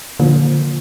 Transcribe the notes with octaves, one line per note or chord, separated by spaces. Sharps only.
A#2 D3 F3